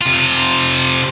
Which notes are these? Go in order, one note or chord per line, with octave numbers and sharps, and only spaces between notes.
C3 F4